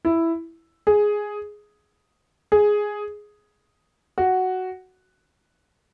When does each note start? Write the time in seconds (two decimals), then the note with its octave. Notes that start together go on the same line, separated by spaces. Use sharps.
0.05 E4
0.87 G#4
2.52 G#4
4.18 F#4